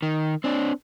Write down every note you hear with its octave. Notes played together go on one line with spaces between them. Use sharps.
D#3
C4 D4